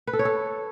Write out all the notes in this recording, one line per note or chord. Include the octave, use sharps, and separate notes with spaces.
B4
A4
C#5
A4